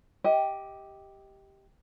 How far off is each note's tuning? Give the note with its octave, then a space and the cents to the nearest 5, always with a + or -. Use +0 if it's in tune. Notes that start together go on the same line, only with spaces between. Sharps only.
G4 +0 D#5 +25